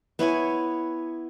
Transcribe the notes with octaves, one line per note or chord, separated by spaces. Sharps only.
B3 E4 C#5 G#5